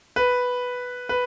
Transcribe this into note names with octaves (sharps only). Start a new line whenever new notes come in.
B4
B4